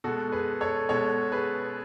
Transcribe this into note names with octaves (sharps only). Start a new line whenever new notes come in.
B2 G#3 F#4 A4
G#4 B4
A4 C#5
B2 G#3 A4 C#5
G#4 B4